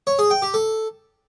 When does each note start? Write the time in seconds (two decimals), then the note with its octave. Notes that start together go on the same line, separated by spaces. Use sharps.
0.07 C#5
0.19 G#4
0.30 G5
0.42 G4
0.54 A4